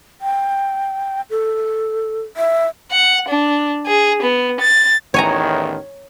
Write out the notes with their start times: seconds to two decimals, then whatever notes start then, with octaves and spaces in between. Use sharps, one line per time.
0.21 G5
1.30 A4
2.37 E5
2.91 F#5
3.29 D4
3.86 G#4
4.22 B3
4.60 A6
5.14 A1 E2 D#3 C#5 G#5 A#5